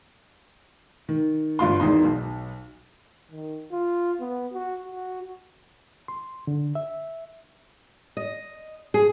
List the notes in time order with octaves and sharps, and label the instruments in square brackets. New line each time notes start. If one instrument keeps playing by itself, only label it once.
[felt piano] D#3
G1 G2 F4 C6
G#1 E2 D#3 D#4 C6
B1
[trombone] D#3
F4
B3
F#4
F#4
[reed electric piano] C6
D3
E5
[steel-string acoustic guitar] D#5
G#4